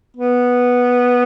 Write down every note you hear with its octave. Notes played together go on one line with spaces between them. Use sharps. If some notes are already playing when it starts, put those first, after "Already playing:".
B3